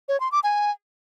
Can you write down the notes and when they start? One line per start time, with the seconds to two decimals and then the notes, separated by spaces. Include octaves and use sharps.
0.09 C#5
0.20 C6
0.32 D6
0.44 G#5